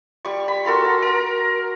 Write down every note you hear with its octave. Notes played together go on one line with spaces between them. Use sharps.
G3 C#6
B5
F#4 A4 A#4 C6
A#5
A#4